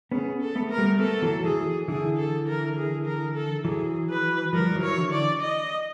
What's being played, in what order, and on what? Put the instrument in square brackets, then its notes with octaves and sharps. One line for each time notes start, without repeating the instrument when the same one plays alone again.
[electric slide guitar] B3 C#4 [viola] G#4
[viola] A4
[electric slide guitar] A3 B3
[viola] A#4
[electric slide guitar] G3 A3
[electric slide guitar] A3 B3 [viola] A4
[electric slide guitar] E3 F#3
[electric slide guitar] E3 F#3 [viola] G#4
[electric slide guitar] D3 E3 [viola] G#4
[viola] A4
A#4
G#4
A#4
A4
[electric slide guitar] E3 F#3 [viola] G#4
[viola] B4
[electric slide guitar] F3 G3 [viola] A#4
[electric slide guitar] E3 F#3
[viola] C#5
[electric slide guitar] D3 E3
[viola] D5
D#5